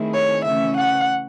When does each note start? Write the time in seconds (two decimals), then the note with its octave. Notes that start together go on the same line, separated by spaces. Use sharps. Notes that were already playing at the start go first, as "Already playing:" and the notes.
Already playing: D#3 A3 C4 E4 G#4
0.14 C#5
0.45 C#3 E3 A3 C#4 E5
0.77 F#5